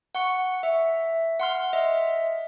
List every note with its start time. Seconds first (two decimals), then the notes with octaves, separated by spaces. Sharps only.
0.15 F#5 C#6 C#7
0.63 E5
1.40 F#5 C6 F6
1.73 D#5 E5